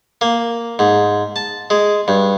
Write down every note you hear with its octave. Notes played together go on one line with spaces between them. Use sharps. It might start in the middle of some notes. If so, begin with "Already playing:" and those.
A#3
G#2
A5
G#3
G2